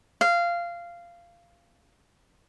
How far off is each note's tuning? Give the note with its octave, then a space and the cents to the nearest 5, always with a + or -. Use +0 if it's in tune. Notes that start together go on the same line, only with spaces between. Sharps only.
F5 -15